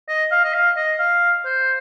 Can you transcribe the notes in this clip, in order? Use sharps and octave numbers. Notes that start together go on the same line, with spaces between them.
D#5
F5
D#5
F5
D#5
F5
C5